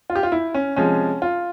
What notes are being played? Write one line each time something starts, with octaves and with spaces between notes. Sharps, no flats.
F4
G4
F4
E4
C#4
C3 F3 G#3 C#4
F4